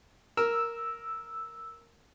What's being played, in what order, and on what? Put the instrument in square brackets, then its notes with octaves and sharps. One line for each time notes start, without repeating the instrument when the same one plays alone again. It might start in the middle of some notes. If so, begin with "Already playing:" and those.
[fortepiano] A#4 [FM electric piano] E6